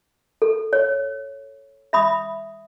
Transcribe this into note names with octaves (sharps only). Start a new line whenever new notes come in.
A4
C#5
E5 B5 D#6